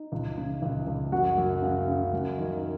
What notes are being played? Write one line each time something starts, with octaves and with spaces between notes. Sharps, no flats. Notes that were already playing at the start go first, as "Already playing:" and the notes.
Already playing: D#4
C#2
C#3
C#2
C#2
F#2 F#4 F#5
F#2
C#3
C#3
F#2
D#3